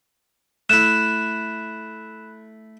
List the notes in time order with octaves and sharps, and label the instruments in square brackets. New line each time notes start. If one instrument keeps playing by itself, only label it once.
[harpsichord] A3 E4 [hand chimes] B5 F#6 [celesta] E7